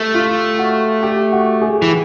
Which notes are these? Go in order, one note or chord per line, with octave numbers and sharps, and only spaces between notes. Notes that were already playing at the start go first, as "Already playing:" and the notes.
Already playing: A3 G4
F4
F#4
G4
F#4
G#4
E3